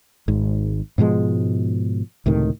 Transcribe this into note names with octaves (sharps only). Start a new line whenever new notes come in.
G#1 G#2
G#2 B2 F3 G#3
C#2 A2 C3 D#3